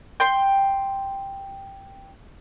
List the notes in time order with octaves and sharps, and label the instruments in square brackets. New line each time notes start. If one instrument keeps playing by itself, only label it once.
[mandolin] G5 C6